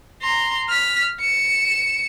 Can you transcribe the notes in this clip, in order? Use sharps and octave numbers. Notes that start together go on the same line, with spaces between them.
A#5 C6
F6 B6
C#7 E7